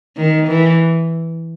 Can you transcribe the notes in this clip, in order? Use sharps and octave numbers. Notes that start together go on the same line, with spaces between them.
D#3
E3